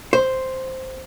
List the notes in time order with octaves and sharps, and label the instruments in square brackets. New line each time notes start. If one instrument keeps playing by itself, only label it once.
[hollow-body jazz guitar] C5